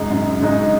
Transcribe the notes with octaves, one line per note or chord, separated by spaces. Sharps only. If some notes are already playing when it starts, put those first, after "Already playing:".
Already playing: F#2 C#3 G#3 D#4
F#2
C#3 G#3 D#4